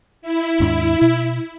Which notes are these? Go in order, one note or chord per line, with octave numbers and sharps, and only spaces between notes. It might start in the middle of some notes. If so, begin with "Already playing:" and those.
E4
D#2 G#2 D4
B2